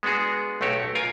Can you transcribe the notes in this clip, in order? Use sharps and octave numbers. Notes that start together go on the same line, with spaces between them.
G#3 B3 D4 F#4 G#4
B1 A3 F#4 G4 C#5
F4 A#4 G#5